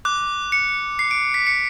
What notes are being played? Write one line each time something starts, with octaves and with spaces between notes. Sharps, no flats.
D6 F#6
C#7
C7
D7
B6
C#7